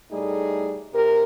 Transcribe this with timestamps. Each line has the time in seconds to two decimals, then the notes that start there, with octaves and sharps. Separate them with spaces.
0.11 A2 G3 A3 D#4 G#4
0.93 C3 G4 A#4